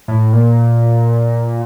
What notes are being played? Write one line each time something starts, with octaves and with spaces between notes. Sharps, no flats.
A2
A#2